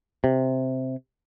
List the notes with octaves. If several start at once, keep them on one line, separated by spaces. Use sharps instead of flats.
C3